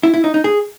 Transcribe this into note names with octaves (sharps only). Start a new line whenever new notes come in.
E4
E4
D#4
D#4
G#4